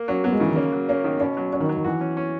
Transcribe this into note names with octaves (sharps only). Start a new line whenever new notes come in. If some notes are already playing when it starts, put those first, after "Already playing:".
Already playing: A#3
F#3 C#4
F#3 B3
G#3
C#3 E3
D#3
A#3 C#4
F#3
A#3 C#4
D#3
B2 C#4
F#3
F#3 C#4
D#3
F#3
D#3
E3 F#4
C#4
C#4